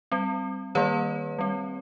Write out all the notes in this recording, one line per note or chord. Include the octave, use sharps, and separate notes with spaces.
G3 C4
D#3 G3 A#3 B4 C#5
G3 C4